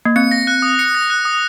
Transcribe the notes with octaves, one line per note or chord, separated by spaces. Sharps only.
A#3
C4 C#7
A#6
F#6
D#6
C#7
A#6
F#6
D#6